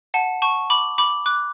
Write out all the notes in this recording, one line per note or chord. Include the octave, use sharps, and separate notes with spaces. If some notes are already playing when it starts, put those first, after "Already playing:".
F#5 A5
A5 C#6
B5 D6
B5 D6
D6 F#6